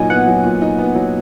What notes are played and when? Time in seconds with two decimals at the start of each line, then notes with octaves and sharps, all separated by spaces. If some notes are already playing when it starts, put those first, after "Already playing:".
Already playing: A#2 F#3 D#4 G#5
0.10 B3 F#5
0.28 F#3
0.44 A#2
0.62 D#4
0.79 B3
0.95 F#3